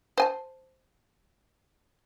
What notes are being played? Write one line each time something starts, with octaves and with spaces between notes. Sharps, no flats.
C5 G#5 A5